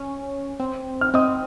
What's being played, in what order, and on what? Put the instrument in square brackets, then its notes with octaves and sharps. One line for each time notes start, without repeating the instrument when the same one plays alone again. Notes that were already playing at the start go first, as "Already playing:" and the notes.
Already playing: [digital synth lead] C#4
C4
[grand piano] F6
[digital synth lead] C4 [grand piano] D#5 D#6